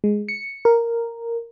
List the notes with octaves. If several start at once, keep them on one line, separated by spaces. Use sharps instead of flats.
G#3
C#7
A#4